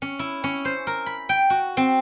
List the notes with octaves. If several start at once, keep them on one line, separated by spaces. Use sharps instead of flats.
C#4
E4
C#4
C5
A#4
B5
G5
F#4
C4